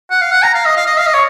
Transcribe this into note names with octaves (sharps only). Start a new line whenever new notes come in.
F#5
F5
F#5
A#5
F5
D#5
F5
D#5
F5
D#5
C#5